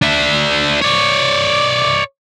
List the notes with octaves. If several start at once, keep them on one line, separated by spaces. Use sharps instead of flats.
D4 E5
C#5 D5